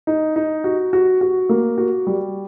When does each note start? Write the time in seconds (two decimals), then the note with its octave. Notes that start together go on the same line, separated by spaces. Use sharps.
0.07 D#4
0.36 D#4
0.64 F#4
0.93 F#4
1.21 F#4
1.49 A#3
1.78 F#4
2.07 G3